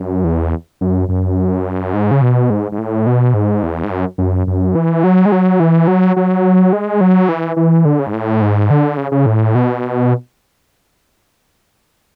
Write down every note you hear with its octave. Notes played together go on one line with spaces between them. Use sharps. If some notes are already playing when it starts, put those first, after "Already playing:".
Already playing: F#2
E2
F#2
F#2
G#2
C#3
B2
G#2
G#2
A2
B2
G#2
E2
G#2
F#2
F#2
F#2
E3
F#3
G#3
F#3
E3
F#3
F#3
G#3
F#3
E3
E3
D3
C#3
G#2
A2
G#2
D3
C#3
C#3
A2
B2